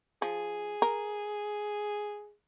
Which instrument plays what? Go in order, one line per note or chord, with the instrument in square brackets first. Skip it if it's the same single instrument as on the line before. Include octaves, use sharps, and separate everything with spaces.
[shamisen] F3 [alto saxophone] G#4
[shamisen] A#4